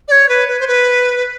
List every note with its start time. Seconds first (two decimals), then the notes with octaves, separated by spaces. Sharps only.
0.08 D5
0.12 C#5
0.29 B4
0.48 B4
0.60 C5
0.68 B4